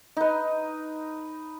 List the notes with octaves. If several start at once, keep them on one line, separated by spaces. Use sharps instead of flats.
D#4 B4